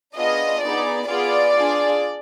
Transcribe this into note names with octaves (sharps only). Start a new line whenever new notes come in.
B3 D4 F4 G#4 D#5
B3 D#4 G#4 D5
B3 F4 G#4 D5
D4 F4 G#4